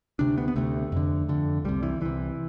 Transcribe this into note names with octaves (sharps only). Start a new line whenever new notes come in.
D2 C3 D4
B3
B3
D2 C3 A3
F2 D3
F2 D3
C2 C3 G3
E3
C2 C3 E3